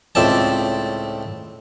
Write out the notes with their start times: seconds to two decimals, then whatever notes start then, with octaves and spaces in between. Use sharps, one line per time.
0.15 C#2 A2 C4 D5 A5